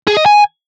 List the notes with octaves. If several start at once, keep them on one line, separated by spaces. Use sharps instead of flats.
G#4
D#5
G#5